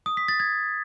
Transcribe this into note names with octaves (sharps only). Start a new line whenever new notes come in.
D#6
B6
A6
G#6